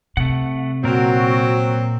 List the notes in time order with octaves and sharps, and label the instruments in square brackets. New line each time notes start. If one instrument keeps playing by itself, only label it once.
[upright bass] C3 [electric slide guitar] A3 F#5
[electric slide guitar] A#2 A#4 [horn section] F#3 C4 [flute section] F#4